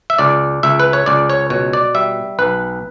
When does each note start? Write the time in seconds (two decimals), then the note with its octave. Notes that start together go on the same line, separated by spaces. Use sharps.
0.10 E5
0.19 C#2 D5
0.63 C#2 E5
0.80 B4
0.93 C#5
1.06 C#2 D5
1.30 C#5
1.50 B2 C#5
1.73 D5
1.94 G3 E5
2.39 B1 B4